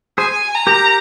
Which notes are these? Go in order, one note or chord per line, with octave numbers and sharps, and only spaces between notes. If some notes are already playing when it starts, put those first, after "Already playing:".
G#4 C5 G#5
A#5
G4 A#4